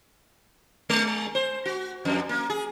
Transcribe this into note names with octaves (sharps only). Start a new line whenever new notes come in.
G#3
C5
F#4
F2
A#3
G#4